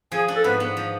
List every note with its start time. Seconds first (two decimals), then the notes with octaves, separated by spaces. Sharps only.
0.12 F3 G#4 G#5
0.28 D4
0.36 A4
0.44 G#2 B3 B4
0.60 B3
0.77 F3